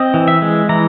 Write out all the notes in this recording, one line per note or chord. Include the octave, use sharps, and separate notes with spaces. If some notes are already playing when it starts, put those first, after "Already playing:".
Already playing: C4 D#5
E3
E5
G#3
E3 A#5